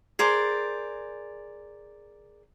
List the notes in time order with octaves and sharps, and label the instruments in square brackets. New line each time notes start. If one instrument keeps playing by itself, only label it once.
[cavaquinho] G#4 A#4 C5 D5